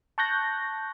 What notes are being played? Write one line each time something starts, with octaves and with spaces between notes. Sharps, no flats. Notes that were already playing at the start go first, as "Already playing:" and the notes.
A5 C#6 F#6 G6 A#6